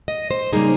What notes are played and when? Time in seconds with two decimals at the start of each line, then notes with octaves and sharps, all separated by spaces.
0.08 D#5
0.31 C5
0.53 C#3 G3 A#3 D#4 G#4